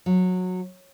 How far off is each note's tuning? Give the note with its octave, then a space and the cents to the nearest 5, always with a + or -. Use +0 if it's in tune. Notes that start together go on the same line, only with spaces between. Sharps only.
F#3 -15